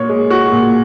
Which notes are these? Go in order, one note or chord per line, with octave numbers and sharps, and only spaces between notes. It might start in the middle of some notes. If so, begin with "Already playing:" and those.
Already playing: A#2 F#4 C#5
G#3
F#4
A#2